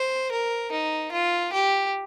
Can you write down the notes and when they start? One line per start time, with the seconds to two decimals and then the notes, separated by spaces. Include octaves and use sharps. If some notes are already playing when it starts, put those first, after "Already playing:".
Already playing: C5
0.32 A#4
0.72 D#4
1.12 F4
1.53 G4